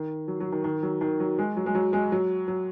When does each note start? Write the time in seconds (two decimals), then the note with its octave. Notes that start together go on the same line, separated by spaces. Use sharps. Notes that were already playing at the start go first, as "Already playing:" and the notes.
Already playing: D#3
0.28 F#3
0.40 F#3
0.52 D#3
0.64 D#3
0.83 F#3
1.01 D#3
1.20 F#3
1.39 G#3
1.57 F#3
1.66 G#3
1.75 F#3
1.93 G#3
2.12 F#3
2.48 F#3